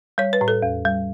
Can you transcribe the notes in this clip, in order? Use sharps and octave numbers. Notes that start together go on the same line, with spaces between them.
G3 C#5
B4
A2
A4
E2
G3